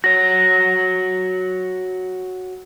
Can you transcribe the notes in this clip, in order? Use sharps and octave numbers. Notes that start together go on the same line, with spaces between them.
F#4 C#5 A#6